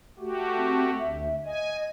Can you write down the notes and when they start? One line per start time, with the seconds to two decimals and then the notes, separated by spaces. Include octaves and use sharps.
0.19 A3 F#4 G4
0.58 C4
0.98 D2 E5
1.46 D#5 G#5